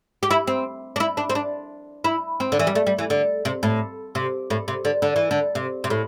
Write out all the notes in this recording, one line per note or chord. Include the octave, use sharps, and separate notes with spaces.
G4
E4
C4
D4
E4
D4
C4
D4
E4
C4
D3
E3
G3
A3
G3
E3
D3
C3
A2
C3
A2
C3
D3
D3
E3
D3
C3
C3
A2